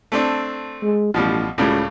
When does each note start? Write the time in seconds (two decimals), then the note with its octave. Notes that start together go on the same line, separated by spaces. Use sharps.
0.12 A3 C4 D4
0.82 G#3
1.14 A1 B2 F3 G3
1.58 C#2 A2 C#3 G3